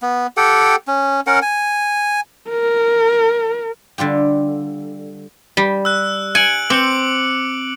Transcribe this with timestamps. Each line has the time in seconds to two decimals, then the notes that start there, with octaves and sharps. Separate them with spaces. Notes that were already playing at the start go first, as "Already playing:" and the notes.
0.02 B3
0.37 G4 A4 F#5 G5
0.87 C#4
1.27 C#4 A#4 F#5
1.42 G#5
2.49 A#4
3.98 D3 G3 F4 G4
5.57 G3
5.85 E6 F#6
6.35 G#5 C#7 D7 F#7
6.70 C4 D6 C#7 F#7